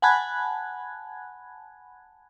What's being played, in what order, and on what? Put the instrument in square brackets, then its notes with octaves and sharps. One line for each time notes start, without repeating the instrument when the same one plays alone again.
[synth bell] F#5 G#5 A5 B5 F#6 G#6